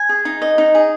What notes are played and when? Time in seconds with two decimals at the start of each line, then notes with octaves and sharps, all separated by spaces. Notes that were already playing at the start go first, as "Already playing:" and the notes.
Already playing: G#5
0.09 G#4
0.25 D#4
0.42 D#5
0.58 D#4
0.75 G#4